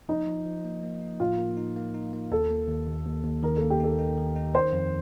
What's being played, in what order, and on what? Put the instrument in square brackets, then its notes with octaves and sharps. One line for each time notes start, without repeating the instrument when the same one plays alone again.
[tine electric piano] F3 [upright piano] D#4
[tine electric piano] F3
F3
A#3
A#3
D#4
[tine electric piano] A2 [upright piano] F4
[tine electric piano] A#3
D#4
A#3
D#4
A#3
[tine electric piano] D#2 [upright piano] A4
[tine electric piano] A#3
D#2
D#2
D#2
D#2
[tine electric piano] D#3 [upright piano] A#4
[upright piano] A4
[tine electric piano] A#3
[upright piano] G4
[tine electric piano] D#4 [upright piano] A4
[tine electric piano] D#4
D#3
D#4
[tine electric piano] D#3 [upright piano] C5
[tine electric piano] F2